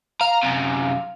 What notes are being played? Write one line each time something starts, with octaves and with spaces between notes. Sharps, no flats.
F5 A#5
F#2 C3